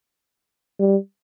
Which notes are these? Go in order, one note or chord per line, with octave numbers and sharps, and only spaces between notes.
G3